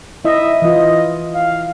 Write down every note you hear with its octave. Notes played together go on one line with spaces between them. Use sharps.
E4 D#5 E5
E3 F4 D#5
F5